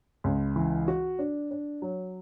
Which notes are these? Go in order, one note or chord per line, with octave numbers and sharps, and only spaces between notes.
C#2
E3
F#4
D4
D4
F#3